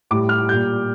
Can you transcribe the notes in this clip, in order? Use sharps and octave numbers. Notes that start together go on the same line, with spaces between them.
A2 G3 D6
F6
A#2 G3 G6